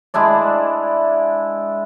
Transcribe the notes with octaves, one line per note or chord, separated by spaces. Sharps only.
G#3 D4 E4 D5